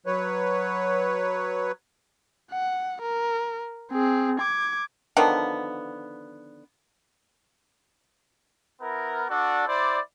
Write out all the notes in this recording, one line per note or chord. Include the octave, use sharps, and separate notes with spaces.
F#3 B4 C#5
F#5
A#4
C4 G#4
D6 G#6
D3 D#3 F3 B3
B3 E4 A#4
D4 F#4 A4 D5
E4 C5 D5